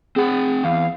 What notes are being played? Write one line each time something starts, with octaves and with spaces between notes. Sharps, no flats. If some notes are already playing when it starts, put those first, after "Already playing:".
C4 G#4 F#5
E2 F5